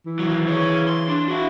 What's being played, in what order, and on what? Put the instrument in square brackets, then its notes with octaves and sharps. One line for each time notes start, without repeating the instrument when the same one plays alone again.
[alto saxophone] E3
[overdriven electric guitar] D#3 F#3
G#4 C#5
C6
D4
E4 F#4